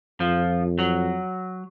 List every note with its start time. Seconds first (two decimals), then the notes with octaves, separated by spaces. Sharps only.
0.20 F2 F3
0.79 F#3